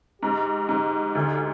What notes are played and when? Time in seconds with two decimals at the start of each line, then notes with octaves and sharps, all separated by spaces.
0.22 G#2 G4
0.69 G#2
1.15 D2